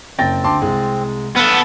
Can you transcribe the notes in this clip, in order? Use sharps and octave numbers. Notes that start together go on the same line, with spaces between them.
F#1 C4 G5 A6 A#6
D2 A5 C6 D6
C2 G#3
B3 A4 F#5 E6 F6